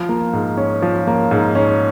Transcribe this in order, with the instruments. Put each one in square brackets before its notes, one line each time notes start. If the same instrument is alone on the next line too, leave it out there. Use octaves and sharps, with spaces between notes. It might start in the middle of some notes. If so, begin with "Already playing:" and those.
Already playing: [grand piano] F3
A#3
G#2
C#4
F3
A#3
G#2
C#4